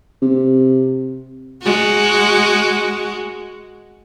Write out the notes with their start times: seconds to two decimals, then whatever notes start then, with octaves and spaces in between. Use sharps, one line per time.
0.22 C3
1.63 G#3 F#4